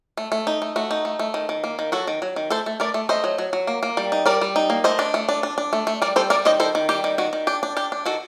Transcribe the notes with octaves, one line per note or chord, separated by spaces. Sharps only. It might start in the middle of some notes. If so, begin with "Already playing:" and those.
A3
A3
D#4
A3
A3 F#4
D#4
A3
A3
D#3
D#3
A#3
D#3
F#3 F#4 A4
D#3
F#3
D#3
A3 A4 C5
A3
A3 A#4 D5
A3
A3 C5 D#5
F#3
F#3
F#3
A#3
A#3
G3
D#4
G3 A#4 D5
G3
D#4
A#3
A3 C5 D#5
D4
A3
D4
D4
D4
A3
A3
G3 A#4 D5
G3 A4 C5
G3 A#4 D5
D#3 C5 D#5
D#3 A4 C5
D#3
G3 G4
D#3
D#3 F#4
D#3
D4 G4
D4
D4 G4
D4
D#3 F#4 A4